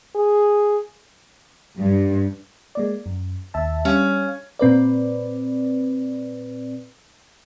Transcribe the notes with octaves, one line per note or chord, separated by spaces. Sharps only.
G#4
G2
G#3 A#3 D5
F#2
D#2 E5 A5
G3 C#4 F5
A#2 C4 B4 D5